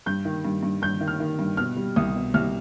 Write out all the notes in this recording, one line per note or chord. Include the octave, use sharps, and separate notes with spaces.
G2 G6
D#3
G2
G2
G2 G6
D#3
F6
D#3
G2
B2 F6
G3
C2 D#6
B2
C2 F6